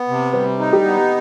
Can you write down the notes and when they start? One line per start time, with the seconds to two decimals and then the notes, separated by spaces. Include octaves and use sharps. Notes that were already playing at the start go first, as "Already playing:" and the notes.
Already playing: B3
0.08 C3
0.33 G3 B4
0.59 D#4
0.73 G4
0.85 B3